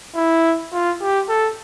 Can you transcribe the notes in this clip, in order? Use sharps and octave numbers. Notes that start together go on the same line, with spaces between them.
E4
F4
G4
A4